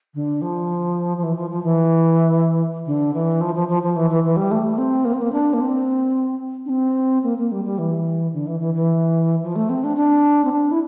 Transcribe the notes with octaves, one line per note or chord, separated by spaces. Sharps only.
D3
F3
F3
E3
F3
F3
E3
D3
E3
F3
F3
F3
F3
E3
E3
E3
G3
A3
C4
A#3
C4
A#3
D4
A#3
C4
D4
C4
A#3
A#3
G3
G3
E3
D3
E3
E3
E3
F3
A3
C4
D4
D4
C4
D4
E4